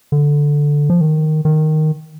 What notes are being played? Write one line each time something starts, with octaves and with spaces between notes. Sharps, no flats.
D3
F3
D#3
D#3